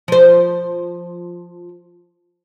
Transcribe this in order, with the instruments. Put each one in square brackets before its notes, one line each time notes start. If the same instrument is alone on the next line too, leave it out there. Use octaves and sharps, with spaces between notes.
[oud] F3 C5